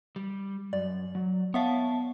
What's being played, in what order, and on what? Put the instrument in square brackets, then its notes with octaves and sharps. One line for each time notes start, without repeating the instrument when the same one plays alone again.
[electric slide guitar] G3
[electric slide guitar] F#2 [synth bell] D5
[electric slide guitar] F#3
[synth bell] B3 E5 F5 [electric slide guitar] C#5 A5